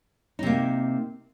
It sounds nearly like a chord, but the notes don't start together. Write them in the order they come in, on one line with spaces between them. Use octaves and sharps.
D#4 C3 A#3